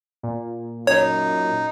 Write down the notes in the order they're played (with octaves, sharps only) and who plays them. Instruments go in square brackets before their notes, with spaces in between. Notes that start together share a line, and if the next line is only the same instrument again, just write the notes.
[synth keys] A#2
[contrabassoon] F#2 [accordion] D#4 [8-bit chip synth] C#5